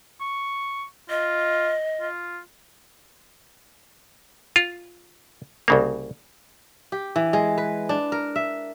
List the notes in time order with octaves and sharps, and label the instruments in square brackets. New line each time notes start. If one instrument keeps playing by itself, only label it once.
[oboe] C#6
[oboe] F4 [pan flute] D#5
[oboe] F4
[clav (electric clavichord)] F4
C2 C#3 A#3
[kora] G4
E3
G#3
B4
D4
A#4
E5